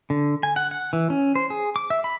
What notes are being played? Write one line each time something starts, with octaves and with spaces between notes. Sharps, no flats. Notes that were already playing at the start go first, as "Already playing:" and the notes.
D3
G#5
F#5
F#5
E3
C#4
C5
G#4
D6
E5
B5